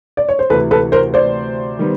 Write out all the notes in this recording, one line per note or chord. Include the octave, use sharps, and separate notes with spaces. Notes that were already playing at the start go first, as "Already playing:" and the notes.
D5
C#5
C5
D2 C3 E3 A4 B4
A4 B4
A#4 C5
C5 D5
D#3 G3 B3